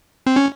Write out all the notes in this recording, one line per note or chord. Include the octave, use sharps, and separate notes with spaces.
C4
C#4